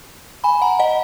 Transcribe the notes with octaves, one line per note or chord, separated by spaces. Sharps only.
G#5 B5
F#5 A#5
D#5 F#5